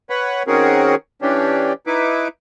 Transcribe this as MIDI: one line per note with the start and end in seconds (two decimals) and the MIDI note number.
0.10 0.43 71
0.10 0.43 73
0.10 0.43 78
0.10 0.43 83
0.47 0.95 51
0.47 0.95 60
0.47 0.95 61
0.47 0.95 66
0.47 0.95 68
0.47 0.95 70
1.22 1.73 52
1.22 1.73 61
1.22 1.73 62
1.22 1.73 67
1.87 2.28 63
1.87 2.28 64
1.87 2.28 71
1.87 2.28 86